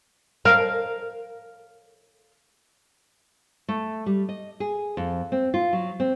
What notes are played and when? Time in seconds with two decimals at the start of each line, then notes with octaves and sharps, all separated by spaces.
0.45 A#4 F5
3.68 A3
4.06 G3
4.29 D#5
4.60 G#4
4.97 F2
5.32 C4
5.54 F4
5.73 F#3
6.00 C4